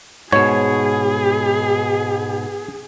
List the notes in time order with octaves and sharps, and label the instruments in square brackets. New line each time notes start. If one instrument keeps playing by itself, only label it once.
[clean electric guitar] G#2 B2 [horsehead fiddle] G#4 [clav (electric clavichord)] C#5